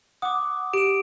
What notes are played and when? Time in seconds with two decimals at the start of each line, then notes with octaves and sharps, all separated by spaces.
0.22 F#5 D6 D#6
0.73 G4 D7 E7